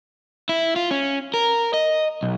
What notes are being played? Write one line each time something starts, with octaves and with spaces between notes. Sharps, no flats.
E4
F4
C#4
A#4
D#5
B1